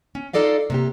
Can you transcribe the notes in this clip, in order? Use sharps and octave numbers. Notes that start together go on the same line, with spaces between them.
C#4
D#4 F4 A4 D5 D#5 F5
C3 A#3 G4